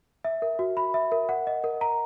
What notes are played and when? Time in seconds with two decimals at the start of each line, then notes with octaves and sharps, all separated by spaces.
0.24 E5
0.42 A#4
0.59 F#4
0.77 B5
0.94 E5
1.12 A#4
1.29 F#5
1.47 D#5
1.64 A#4
1.81 A#5